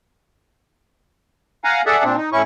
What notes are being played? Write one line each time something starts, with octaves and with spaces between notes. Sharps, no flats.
F5 F#5 G#5 A#5
G#4 A4 D5 E5 F#5
A#2 C4 D4
D#4
A2 C#4 E4 C#6